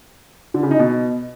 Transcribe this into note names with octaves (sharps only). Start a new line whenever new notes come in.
D3
C#3
D#4
B2